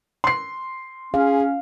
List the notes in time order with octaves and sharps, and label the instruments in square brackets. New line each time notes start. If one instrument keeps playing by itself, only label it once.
[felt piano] C6 C7
[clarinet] C#4 [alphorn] G#4 [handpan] F5